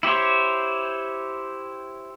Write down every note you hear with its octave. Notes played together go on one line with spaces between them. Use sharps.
E4 G4 C5 C#5